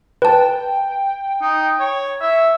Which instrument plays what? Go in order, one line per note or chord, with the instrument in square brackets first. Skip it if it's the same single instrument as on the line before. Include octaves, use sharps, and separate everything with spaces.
[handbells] B4 A5 [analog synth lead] G5
[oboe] D#4
C#5
E5